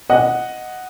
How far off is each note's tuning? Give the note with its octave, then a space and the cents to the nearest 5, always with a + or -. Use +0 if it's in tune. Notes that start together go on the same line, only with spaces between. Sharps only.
D#5 +0 F#5 +0